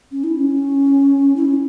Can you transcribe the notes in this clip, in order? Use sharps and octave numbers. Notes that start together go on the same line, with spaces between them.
C#4
E4
C#4
E4
C#4